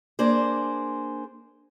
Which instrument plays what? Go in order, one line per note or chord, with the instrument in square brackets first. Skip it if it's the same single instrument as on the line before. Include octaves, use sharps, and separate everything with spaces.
[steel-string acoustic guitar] A#3 D4 G#4 C5